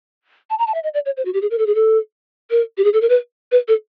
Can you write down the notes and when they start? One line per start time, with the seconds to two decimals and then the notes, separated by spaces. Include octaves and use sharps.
0.50 A5
0.59 A#5
0.67 A5
0.74 E5
0.84 D#5
0.94 D5
1.06 C#5
1.17 C5
1.25 F#4
1.34 G4
1.42 G#4
1.51 A#4
1.58 A4
1.67 G#4
1.75 A4
2.51 A#4
2.77 G4
2.84 G#4
2.93 A4
3.01 A#4
3.09 B4
3.52 B4
3.68 A4